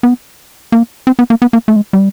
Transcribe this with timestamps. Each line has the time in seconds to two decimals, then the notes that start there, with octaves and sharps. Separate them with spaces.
0.03 B3
0.72 A#3
1.07 C4
1.19 B3
1.30 A#3
1.42 B3
1.53 A#3
1.68 A3
1.76 G#3
1.93 G3